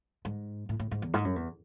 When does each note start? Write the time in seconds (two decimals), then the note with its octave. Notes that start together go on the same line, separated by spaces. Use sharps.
0.25 G#2
0.69 A2
0.80 A2
0.91 G#2
1.02 E2
1.14 G#2
1.25 F#2
1.36 E2